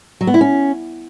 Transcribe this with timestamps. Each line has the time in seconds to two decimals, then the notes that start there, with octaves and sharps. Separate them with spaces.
0.21 F#3
0.27 B3
0.34 E4
0.41 C#4